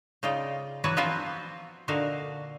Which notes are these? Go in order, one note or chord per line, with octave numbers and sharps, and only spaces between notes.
C#3 D#4 F4 D5 G5
E3 F#3 B3 F#4 B4
F3 B3 C4 F4 F#4 B4
A#2 D3 D#4 F#4 E5 F5